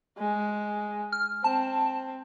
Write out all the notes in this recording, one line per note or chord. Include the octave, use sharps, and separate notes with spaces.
G#3
F6
C4 A5